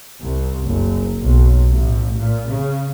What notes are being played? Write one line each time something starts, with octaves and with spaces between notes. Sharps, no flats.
C2
F#1
B1
A1
A#2
C#3